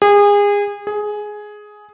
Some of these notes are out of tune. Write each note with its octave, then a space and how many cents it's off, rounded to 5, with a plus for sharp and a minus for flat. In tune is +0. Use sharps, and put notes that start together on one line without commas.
G#4 -30
G#4 +10